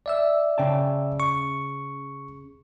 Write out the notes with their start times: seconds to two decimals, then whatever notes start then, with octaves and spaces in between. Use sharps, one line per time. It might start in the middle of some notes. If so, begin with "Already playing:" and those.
0.06 D5 E5 E6
0.58 C#3 G5 A5
1.20 C#6